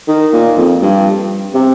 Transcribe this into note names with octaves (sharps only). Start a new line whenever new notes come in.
D#3
A#2
F2
G2
C3